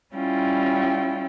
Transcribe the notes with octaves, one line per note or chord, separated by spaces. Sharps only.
G3 C#4 E4 F4 G5